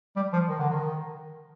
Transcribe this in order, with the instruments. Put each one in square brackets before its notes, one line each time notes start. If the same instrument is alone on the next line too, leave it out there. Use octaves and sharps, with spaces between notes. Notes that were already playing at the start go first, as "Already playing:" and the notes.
[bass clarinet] G3
F3
D#3
D3
D#3